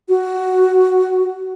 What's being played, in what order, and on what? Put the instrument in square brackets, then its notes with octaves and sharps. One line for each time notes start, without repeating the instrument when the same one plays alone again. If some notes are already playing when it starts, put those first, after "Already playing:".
[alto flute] F#4